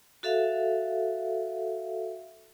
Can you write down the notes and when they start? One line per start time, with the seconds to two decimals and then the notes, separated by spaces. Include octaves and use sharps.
0.23 F#4 A4 E5 F5